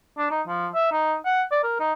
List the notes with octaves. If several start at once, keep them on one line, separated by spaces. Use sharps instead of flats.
D4
D#4
F3
E5
D#4
F#5
D5
A#4
D#4